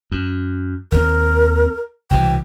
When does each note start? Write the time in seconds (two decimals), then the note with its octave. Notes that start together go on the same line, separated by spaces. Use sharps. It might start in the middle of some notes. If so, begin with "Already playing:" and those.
0.12 F#2
0.92 D#2 D#3 C4 A#4
2.10 C2 B2 E3 G5